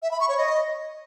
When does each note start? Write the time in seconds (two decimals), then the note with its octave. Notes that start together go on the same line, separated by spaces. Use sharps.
0.03 E5
0.11 B5
0.20 C#6
0.29 C#5
0.38 D#5